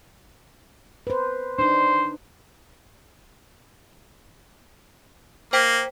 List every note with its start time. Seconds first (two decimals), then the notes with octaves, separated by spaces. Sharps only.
1.07 B4 C5
1.59 D4 D#4 C5
5.53 A#3 C5 G5 B6